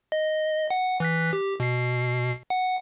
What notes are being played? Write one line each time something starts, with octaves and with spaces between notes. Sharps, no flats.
D#5
F#5
E3 F#6 B6
G4
B2 C7
F#5